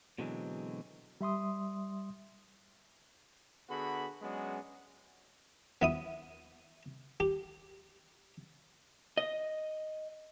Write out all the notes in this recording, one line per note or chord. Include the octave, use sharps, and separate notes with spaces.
B2 D3 E3 F#3 G#3 C4
G3 E5 C6 D#6
D3 B3 F#4 G#4 B5
F#3 G#3 B3 C#4 D4 F#4
B3 E4 D#6
G4
D#5